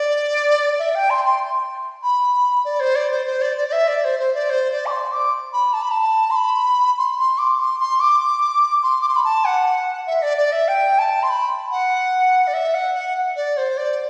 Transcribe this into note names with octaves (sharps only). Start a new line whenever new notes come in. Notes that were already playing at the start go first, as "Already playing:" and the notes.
Already playing: D5
E5
G5
C6
C6
B5
D5
C5
D5
C5
C5
D5
D5
D5
E5
D5
C5
C5
D5
C5
D5
D6
C6
D6
B5
A5
B5
A5
C6
B5
C6
C6
D6
C6
C6
D6
C6
D6
C6
B5
A5
F#5
E5
D5
D5
E5
G5
A5
C6
B5
F#5
D5
E5
F#5
F#5
D5
C5
D5